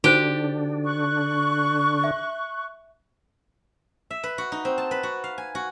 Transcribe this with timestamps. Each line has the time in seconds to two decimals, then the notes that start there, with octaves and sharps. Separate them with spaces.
0.04 D3 D4 D#4 F#4 G4 C5
0.85 C#6 F#6
2.04 E5
4.11 E5
4.24 B4
4.38 F#4
4.52 D#4
4.65 C4
4.78 A5
4.91 B4
5.03 F#4
5.24 F5
5.38 G#5
5.55 F#4